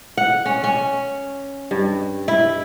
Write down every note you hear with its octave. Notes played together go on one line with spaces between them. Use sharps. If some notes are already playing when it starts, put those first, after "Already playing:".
F#5
C#4
C#4
G2
E4